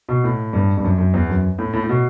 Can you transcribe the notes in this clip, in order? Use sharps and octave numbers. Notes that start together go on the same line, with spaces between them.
B2
A2
G2
G2
F#2
F#2
E2
F#2
A2
A2
A2
B2